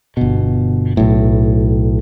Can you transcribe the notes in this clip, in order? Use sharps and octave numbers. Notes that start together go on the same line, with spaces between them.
G1 B2
B1 A2